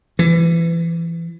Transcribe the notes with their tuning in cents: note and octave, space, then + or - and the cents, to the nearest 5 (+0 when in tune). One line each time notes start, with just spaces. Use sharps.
E3 +25